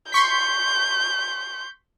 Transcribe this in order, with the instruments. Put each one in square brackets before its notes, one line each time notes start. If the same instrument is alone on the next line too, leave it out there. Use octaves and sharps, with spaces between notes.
[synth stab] C6 C#6 B6 [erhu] G6